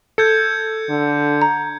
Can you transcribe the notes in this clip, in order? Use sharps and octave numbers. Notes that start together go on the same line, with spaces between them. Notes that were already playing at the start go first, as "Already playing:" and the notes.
A4 G6 G#6 C#7
D3
A#5